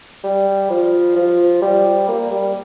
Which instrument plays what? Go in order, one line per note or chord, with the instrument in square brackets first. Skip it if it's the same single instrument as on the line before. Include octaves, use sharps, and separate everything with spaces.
[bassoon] G3
F3
F3
G3
A#3
G3